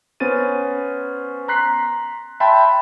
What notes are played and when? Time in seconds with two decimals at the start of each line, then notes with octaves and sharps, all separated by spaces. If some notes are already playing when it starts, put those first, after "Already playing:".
0.20 B3 C#4 C5 A6 D#7
1.48 A#5 C6 F#6 B6 C7
2.40 E5 G5 A5 B5 C6